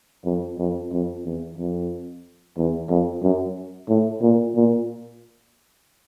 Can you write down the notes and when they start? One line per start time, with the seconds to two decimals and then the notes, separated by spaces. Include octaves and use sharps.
0.25 F2
0.59 F2
0.92 F2
1.25 E2
1.58 F2
2.57 E2
2.89 F2
3.23 F#2
3.89 A2
4.22 A#2
4.55 A#2